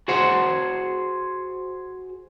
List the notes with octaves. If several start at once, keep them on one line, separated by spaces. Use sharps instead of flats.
F#4 G#4 C5 F#5